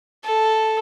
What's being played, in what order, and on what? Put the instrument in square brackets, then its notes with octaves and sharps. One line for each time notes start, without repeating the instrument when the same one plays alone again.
[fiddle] A4